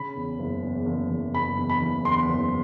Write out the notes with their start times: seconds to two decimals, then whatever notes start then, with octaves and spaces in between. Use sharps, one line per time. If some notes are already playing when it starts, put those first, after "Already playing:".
Already playing: C#3 B5
0.16 E2
0.39 F#1
0.63 E2
0.86 F#1
1.10 F#1
1.34 F#1 B5
1.57 E2
1.69 B5
1.81 F#1
2.05 E2 C6
2.29 F#1